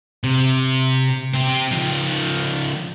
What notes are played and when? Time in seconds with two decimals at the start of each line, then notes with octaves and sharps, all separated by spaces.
0.24 C3
1.34 C4 G4
1.72 C#2 F3